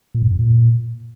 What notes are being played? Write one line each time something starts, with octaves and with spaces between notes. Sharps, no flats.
A#2
G2
F2
A#2